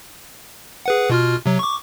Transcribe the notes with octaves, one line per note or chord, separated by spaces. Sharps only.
G#4 B4 F#5
B2 F4 F6
C3 F#3
C#6 D6